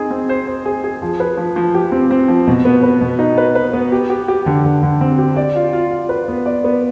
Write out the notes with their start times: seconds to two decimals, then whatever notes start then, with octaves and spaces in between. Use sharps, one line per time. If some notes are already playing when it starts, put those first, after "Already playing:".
Already playing: C4 D#4 G#4
0.11 C4
0.29 C5
0.47 C5
0.66 G#4
0.84 G#4
1.02 F3
1.20 B4
1.37 F3
1.56 F3
1.75 G4
1.92 C4
2.11 C4
2.28 F3
2.47 B2
2.65 B3
2.83 B4
3.01 B2
3.19 D#4
3.38 B4
3.55 B4
3.73 B3
3.92 G4
4.10 G4
4.28 G4
4.46 D3
4.65 D3
4.83 D3
5.01 C4
5.18 G4
5.37 D5
5.56 F4
5.73 F4
5.91 F4
6.09 B4
6.28 B3
6.46 D5
6.64 B3